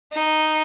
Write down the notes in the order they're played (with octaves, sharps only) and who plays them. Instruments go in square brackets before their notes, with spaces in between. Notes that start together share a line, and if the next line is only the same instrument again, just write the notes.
[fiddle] D#4